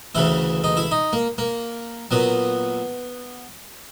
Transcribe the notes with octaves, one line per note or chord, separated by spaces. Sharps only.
D2 C#3 E3 E4
D#4
E4
D#4
A#3
A#3
A#2 F#3 B3